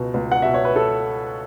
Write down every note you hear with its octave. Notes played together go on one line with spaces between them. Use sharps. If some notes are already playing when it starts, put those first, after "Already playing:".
Already playing: C#2 B2
C#2
F#5
B2 E5
C#5
B4
A4